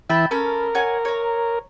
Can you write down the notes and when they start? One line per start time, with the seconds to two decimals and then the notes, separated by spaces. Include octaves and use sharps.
0.09 E3 E5 G5 A5 B5
0.31 C#4 A4 A#4 B5
0.75 C#5 F#5 G#5
1.05 C#5 A#5